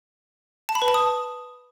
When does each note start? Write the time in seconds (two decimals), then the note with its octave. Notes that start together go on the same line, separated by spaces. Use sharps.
0.69 A5
0.75 B5
0.82 B4
0.88 A5
0.94 D#6